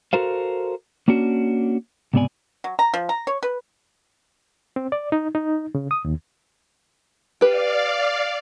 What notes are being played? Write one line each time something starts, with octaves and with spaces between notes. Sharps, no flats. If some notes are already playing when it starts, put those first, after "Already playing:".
F#4 A4 A#4 C5 F5
A#3 C#4 D4 F#4
C#2 G#2 C3 B3 D5 G#5
F#3
A#5
F3
A#5
C#5
B4
C4
D5
D#4
D#4
C#3
D#6
D#2
G4 B4 D5 F5